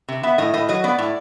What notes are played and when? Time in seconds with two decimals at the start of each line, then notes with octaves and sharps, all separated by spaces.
0.08 C3
0.23 B3 E5
0.38 A2 D#5
0.54 A2 D#5
0.69 F#3 D#5
0.84 B3 D5
0.98 A2